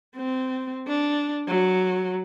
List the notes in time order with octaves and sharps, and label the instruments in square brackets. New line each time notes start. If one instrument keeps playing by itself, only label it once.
[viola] C4
D4
F#3